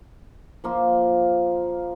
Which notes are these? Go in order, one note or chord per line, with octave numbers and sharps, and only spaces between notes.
F3 A#3 F4